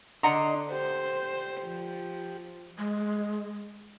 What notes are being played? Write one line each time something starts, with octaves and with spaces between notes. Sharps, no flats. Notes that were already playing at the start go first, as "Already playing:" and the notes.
D3 D4 D#5 F#5 A#5 C6
G4 C5
F3
G#3